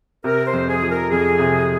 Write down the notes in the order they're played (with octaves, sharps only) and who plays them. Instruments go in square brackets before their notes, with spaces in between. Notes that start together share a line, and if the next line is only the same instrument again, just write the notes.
[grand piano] C3 [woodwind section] A#4
[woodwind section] C5
[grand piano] F2
[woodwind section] G#4
[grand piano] F3
[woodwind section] A#4
[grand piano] F2 [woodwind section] G#4
[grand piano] C3